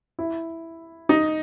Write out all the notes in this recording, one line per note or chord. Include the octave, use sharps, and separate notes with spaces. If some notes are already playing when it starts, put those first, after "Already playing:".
E4
D#4